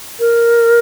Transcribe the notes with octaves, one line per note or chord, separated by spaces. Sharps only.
A#4